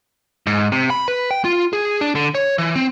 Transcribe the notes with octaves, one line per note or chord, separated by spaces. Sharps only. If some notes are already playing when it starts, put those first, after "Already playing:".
G#2
C3
B5
B4
G5
F4
G#4
D4
D3
C#5
E3
C4